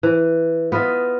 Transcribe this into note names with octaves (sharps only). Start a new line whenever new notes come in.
E3
B3 F4 D#5 E5